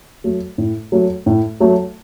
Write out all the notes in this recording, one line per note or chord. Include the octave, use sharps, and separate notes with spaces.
F#3 A3
A2
F#3 A3
A2
F#3 A3